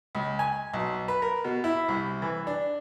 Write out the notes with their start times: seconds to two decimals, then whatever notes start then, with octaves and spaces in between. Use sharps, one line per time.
0.15 C#2
0.39 G#5
0.74 B1
1.08 B4
1.22 A#4
1.44 B2
1.64 E4
1.88 C2
2.22 E3
2.47 D4